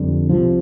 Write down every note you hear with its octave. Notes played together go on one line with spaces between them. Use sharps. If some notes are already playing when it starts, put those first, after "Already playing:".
Already playing: F2 D3 G3
C2 C3 F3